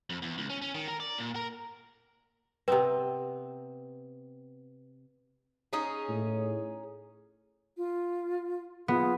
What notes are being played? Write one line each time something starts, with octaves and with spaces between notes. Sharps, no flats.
F2
E2
C#2
C#4
C#4
D#3
A#4
D5
A#2
A#4
C3 B3 C4 B4
C#4 D#4 G#4
A2
F4
B3 F4 G#4